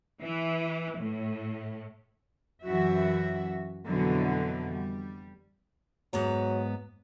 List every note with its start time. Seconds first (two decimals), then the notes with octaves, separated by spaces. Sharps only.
0.22 E3
0.98 A2
2.63 F#2 E3 F#3 F#4 E5
3.87 F2 B2 D3 E3 F#3
4.71 G3
6.13 G#2 F#3 B3 A#5